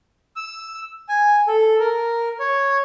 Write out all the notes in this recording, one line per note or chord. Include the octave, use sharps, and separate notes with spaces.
E6
G#5
A4
A#4
C#5